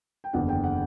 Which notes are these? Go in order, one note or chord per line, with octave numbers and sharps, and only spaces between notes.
G5
F#1 E2 D3 F#5
G5
F#5